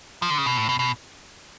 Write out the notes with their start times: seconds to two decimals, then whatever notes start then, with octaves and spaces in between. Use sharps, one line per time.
0.22 F3
0.30 D3
0.38 C#3
0.46 B2
0.57 A2
0.69 B2
0.79 B2